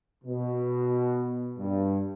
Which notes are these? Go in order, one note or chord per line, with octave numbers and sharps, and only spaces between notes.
B2
G2